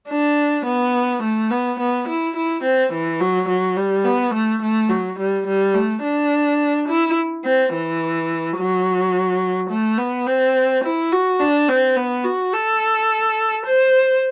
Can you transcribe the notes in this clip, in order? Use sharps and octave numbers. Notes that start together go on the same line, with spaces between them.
D4
B3
A3
B3
B3
E4
E4
C4
E3
F#3
F#3
G3
B3
A3
A3
F#3
G3
G3
A3
D4
E4
C4
E3
F#3
A3
B3
C4
E4
F#4
D4
C4
B3
F#4
A4
C5